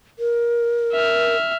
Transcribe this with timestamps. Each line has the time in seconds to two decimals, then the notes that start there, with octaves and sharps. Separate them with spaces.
0.19 A#4
0.92 E5 F6